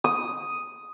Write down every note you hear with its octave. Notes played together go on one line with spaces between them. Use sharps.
D#6